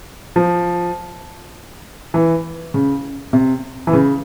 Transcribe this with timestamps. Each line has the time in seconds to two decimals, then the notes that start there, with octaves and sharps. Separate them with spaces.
0.36 F3
2.14 E3
2.74 C#3
3.33 C3
3.87 E3
3.93 C#3